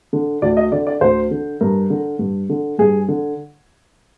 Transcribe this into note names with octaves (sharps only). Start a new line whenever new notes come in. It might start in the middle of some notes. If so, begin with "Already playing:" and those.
D3
D2 D5
D#5
D3 D5
D5
D2 C5
D3
G2 A#4
D3
G2
D3
G2 G#4
D3